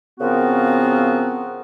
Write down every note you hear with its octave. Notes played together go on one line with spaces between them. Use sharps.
C#3 F3 B3 C4 F#4 A#4